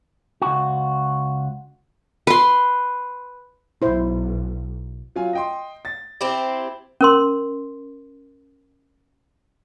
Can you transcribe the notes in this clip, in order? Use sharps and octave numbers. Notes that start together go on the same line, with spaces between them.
C#2 F#4
B4 C6
B1 E4 C5
F#3 F4 G#5
D#5 G5 C6
A6
C4 E4 G4
C#4 A#4 C6